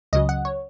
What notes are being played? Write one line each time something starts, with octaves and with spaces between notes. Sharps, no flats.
C#2 C#3 F#3 D#5
F#5
C#5